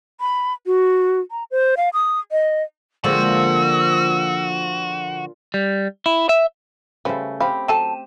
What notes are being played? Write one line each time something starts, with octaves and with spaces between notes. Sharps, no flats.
B5
F#4
A#5
C5
F5
D#6
D#5
A#2 D3 F3 G#3 F4 F#4 G5 E6
G3
E4
E5
C#3 G3 A3 B4 C5
C4 G4 F5 B5
F#3 A4 G5 A5 D#7 E7